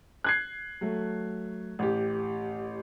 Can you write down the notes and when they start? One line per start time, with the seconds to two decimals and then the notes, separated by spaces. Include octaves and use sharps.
0.24 F#6 G#6 C7
0.81 F#3 A3
1.79 A1 G4